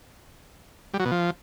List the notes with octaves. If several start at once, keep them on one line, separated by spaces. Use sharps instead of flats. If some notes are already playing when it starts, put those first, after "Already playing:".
G3
F#3
B2
F3